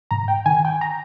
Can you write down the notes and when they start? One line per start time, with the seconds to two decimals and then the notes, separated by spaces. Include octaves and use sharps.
0.11 G#2 A#5
0.28 G5
0.46 D#3 G#5
0.65 G5
0.81 A#5